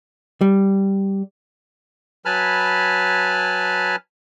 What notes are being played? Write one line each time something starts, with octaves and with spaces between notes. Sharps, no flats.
G3
F#3 B4 G#5 A5 B5 F6